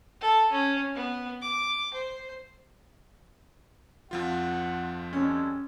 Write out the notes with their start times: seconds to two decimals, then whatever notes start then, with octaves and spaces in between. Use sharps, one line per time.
0.21 A4
0.51 C#4
0.95 B3
1.42 D6
1.93 C5
4.11 F2 F3 F4 F#5
5.13 G3 G#3 C#4 A4